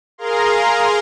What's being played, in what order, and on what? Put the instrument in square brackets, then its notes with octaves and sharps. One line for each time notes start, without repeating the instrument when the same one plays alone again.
[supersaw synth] G#4 A#4 F5 A#5 C6